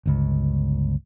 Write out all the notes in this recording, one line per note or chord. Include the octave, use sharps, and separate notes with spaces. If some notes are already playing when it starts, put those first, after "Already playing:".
G1 C#2